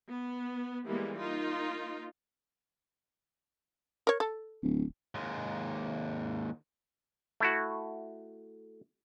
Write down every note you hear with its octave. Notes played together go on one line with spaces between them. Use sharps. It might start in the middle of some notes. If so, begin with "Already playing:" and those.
B3
E3 G3 G#3 A#3 B3
A#3 D#4 F4
A#4 C#5
A4
D1
D#2 G#3
A3 E4 F#4